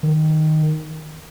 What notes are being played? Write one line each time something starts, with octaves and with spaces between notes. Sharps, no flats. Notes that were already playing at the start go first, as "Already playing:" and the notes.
D#3